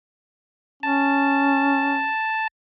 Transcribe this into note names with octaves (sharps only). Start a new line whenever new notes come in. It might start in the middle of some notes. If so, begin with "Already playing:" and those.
C#4 A5